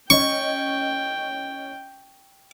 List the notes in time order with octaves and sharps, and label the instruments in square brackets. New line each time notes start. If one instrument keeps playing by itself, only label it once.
[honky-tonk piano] C#4 D#5 [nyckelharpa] G5 [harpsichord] C#6